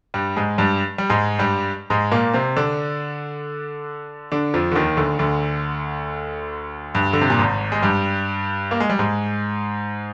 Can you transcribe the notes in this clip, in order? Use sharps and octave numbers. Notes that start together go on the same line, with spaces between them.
G2 G3
G#2 G#3
G2 G3
G3
G#2 G#3
G2 G3
G#2 G#3
A#2 A#3
C3 C4
D3 D4
D3 D4
F2 F3
D3
D#2 D#3
D2 D3
D2 D3
G2
D3
C3
A#2
G#1 G#2
G#3
G2 G3
A#3
G#3
G3
G#2 G#3